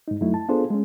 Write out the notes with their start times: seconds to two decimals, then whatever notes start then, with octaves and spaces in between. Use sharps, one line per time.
0.08 G#2 D#4
0.21 F#2 F#3 A3 D#4 E4
0.34 A5
0.49 B3 D4 F4 G#4 A4 C5
0.70 G#3 C#4